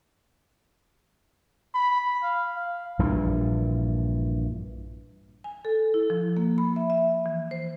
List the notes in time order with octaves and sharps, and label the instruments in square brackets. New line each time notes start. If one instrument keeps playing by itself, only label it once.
[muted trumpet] B5
F5
F5
[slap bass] A#1 G2 A#2 E3
[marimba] G#5
A4
E4
F3
A#3
B5
E5
E5
E3
C5